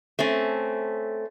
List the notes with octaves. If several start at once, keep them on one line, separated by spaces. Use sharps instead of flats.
A3 C4 C#4